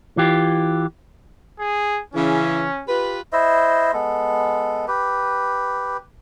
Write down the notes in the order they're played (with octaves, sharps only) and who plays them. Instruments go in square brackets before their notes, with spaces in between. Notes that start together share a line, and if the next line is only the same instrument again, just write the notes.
[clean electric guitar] E3 F4 G4
[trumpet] G#4
[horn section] C#3 E3 [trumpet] C#4
[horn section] F4 G4 B4
[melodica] E4 C5 D#5 E5
G#3 B3 A4
G4 B4